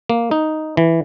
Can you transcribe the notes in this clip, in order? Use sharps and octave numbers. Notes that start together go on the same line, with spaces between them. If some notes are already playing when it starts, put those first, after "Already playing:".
A#3
D#4
E3